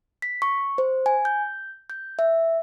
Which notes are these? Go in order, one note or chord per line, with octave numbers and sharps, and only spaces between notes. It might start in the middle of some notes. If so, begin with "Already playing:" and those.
B6
C#6
C5
G#5
G6
G6
E5